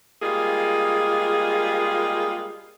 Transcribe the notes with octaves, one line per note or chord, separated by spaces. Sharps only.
G3 G#3 A#3 F4 G#4